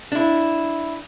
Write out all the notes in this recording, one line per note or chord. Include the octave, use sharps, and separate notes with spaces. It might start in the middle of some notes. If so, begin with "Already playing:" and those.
D4 E4